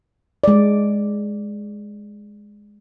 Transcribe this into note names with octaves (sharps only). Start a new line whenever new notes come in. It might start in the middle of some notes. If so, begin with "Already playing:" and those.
G#3 D5